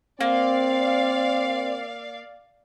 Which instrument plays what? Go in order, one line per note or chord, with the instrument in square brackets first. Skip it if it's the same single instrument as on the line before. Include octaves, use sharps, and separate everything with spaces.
[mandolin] A#3 [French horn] C4 [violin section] D5 F5